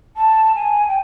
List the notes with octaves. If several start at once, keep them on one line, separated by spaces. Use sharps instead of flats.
A5
G#5
G5